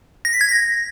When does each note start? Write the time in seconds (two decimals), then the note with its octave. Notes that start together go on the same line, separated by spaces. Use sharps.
0.25 A#6
0.33 B6
0.41 G#6
0.49 A#6